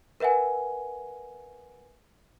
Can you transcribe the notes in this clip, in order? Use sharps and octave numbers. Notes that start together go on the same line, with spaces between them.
A#4 B4 E5 F#5 G#5